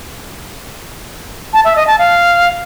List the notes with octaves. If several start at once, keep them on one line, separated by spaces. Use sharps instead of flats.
A5
E5
D#5
A5
F5